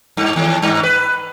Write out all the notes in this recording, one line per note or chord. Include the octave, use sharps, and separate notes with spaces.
G2
D#2
G2
B4